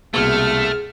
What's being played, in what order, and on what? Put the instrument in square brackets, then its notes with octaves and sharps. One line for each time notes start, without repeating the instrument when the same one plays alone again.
[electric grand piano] C2 B2 A#3 [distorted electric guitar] A3 [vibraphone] G#4 [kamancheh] F6